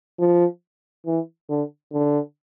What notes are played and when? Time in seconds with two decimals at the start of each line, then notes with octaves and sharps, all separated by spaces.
0.19 F3
1.06 E3
1.50 D3
1.93 D3